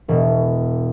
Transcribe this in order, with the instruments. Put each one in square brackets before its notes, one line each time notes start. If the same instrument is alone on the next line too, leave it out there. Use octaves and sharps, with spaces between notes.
[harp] E1 B2